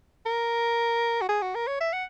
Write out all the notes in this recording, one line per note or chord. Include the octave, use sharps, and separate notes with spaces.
A#4
F#4
G#4
F#4
A#4
C#5
E5
F#5